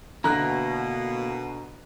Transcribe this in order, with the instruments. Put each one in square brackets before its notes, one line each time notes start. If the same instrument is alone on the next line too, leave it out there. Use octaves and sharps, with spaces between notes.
[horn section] B2 [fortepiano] D3 [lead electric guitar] A#3 E4 [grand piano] A#5 F#6